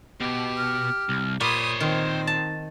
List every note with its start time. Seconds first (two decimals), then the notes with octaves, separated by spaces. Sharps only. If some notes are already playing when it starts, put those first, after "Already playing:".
0.20 B2 G4
0.57 F6
1.09 C2
1.41 A#2 C5 C#5 B5 D#6
1.80 D#3 C4 D#4
2.27 A5